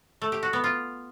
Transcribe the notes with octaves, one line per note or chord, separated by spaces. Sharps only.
A3
G4
F#4
B3
F4